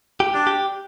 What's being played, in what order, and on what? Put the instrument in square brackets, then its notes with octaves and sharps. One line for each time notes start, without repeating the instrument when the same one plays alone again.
[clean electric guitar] G4
[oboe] D4
[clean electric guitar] G4